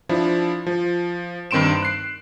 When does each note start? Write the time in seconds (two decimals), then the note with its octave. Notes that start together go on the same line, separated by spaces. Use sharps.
0.09 F3 D4 E4
0.66 F3
1.51 G2 D#3 C4 C6 D7 E7
1.83 F#6 C7